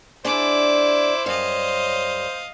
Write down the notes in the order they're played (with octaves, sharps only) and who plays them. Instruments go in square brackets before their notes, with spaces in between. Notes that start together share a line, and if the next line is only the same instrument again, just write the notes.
[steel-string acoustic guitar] D4 G#4 D5 [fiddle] E4 D6 [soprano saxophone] C5
[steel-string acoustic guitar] F#2 G3 C#5 [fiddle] D#5 F5